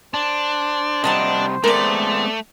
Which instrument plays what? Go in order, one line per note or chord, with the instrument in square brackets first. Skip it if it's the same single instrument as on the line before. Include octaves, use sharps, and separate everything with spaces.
[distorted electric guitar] D4 [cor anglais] C5
[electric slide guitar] C3 G3 F#5 [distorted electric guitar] D4 [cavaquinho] D#5 A5 A#5
[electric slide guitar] G#3 B3 C4 [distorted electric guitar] A3 [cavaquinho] A#4 D5